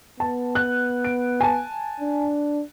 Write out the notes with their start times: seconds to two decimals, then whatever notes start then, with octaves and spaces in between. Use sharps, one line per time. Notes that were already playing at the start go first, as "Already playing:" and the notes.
0.20 B3 A5
0.55 F#6
1.04 D7
1.41 G#5 A5
2.00 D4